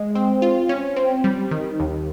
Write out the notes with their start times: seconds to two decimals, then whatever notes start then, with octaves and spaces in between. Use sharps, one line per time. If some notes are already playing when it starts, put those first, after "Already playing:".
Already playing: G#3
0.15 C4
0.42 F4
0.69 C#4
0.96 C4
1.24 G3
1.51 D#3
1.80 D#2